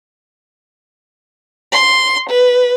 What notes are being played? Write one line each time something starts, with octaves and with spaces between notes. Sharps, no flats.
C6
B4